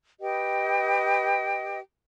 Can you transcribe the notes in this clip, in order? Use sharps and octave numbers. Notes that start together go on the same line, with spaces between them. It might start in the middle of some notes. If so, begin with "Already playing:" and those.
G4 B4 D#5 G5